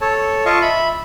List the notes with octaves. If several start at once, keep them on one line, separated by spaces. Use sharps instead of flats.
A4 C#5 A5
F4 D#5 F5 A5 C#6
E5 B5